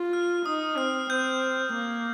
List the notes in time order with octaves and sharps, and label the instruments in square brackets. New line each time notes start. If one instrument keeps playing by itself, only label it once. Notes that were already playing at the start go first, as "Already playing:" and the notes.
Already playing: [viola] F4
[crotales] F6
[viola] D#4 [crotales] D#6
[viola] C4 [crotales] F6
[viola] C4 [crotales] G6
[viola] A#3